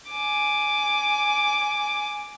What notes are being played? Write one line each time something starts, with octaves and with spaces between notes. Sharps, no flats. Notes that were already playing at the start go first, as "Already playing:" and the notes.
G#5 D6